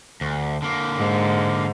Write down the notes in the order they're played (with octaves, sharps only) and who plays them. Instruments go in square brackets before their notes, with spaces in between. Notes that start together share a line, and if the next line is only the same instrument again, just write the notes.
[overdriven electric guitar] D2
D3 A#3
[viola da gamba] G#2